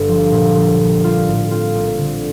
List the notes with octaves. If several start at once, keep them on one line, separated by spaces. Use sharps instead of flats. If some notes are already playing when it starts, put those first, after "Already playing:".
Already playing: G1 D3
F3
A#2
A#1
A#1
G3 F4
A2
C4 F4
A#1
D3